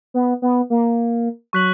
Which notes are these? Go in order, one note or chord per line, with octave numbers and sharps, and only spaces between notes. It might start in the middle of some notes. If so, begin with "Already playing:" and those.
B3
B3
A#3
F#3 C#6 F#6 B6 F#7